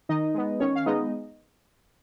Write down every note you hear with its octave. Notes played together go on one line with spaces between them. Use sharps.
D#3 D#4 D#5
G#3 B3
D#3 C#4 C#5
F5
G#3 B3 D#4 D#5